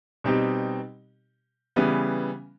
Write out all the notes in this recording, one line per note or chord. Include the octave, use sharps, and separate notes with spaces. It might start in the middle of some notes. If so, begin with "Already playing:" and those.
B2 G3 C4 D#4 G4
C#3 E3 G3 B3